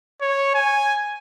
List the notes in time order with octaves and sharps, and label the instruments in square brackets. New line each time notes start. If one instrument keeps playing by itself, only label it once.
[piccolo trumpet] C#5
G#5